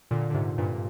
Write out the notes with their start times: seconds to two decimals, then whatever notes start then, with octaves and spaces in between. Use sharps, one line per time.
0.11 A#2 D3
0.30 D3
0.34 G#2 C3
0.58 G2 A#2